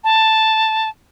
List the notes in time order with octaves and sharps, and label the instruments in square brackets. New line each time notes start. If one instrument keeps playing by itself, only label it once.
[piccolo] A5